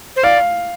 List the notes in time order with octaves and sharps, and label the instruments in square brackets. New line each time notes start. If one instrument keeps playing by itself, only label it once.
[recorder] C5
[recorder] D5 [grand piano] F5